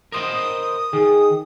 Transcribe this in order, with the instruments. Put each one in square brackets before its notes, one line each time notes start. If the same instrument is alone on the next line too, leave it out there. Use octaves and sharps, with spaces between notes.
[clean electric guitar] A#4 C5 D#5 [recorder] D#6
[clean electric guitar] D#3 [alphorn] G#4